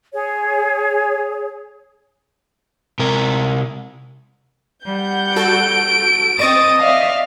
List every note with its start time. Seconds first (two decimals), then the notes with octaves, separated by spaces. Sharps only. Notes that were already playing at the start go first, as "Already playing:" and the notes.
0.13 G#4 C#5
2.99 C3 A#4
4.86 G3 F#5 G6
5.36 F#4 A4 D7
6.39 C4 D#5 C#6 D#6 A6 E7
6.81 D5 E5 F5